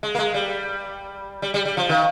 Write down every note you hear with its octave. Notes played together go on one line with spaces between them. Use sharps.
G#3
A#3
G#3
G3
G3
G3
G3
F3
D#3